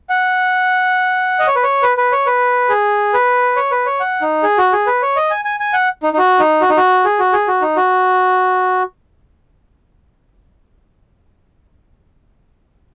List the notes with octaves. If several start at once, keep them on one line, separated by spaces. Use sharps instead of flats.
F#5
D#5
C#5
B4
C#5
B4
B4
C#5
B4
G#4
B4
C#5
B4
C#5
F#5
D#4
G#4
F#4
G#4
B4
C#5
D#5
G#5
G#5
G#5
F#5
D#4
D#4
F#4
D#4
F#4
D#4
F#4
G#4
F#4
G#4
F#4
D#4
F#4